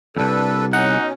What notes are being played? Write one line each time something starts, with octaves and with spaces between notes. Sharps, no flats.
C2 F2 D4 A4 B4
B2 C#4 D#4 F#5